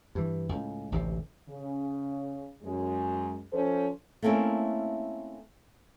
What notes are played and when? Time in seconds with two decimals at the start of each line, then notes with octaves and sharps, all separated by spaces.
0.15 G2 E3
0.49 C#2 A2
0.92 A1 D2 G#2 C3
1.49 C#3
2.63 F#2 G#3
3.53 F3 C#4 A4 C5
4.22 A3 A#3 C4 C#4 E4